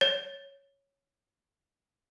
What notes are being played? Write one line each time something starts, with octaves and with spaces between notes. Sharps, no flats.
C#5 A6